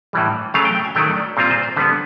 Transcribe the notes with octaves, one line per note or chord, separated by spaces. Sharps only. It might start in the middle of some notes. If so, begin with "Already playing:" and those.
A2 E3 G3
C#3 F#3 A3 F5
G5
G5
G#5
D#3 F#3 A3 G5
D5
A#2 G3 C4 F4 C5
C5
C5
D3 G3 B3 B4